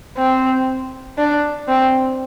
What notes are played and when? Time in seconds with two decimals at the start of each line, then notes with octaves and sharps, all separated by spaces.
0.18 C4
1.18 D4
1.68 C4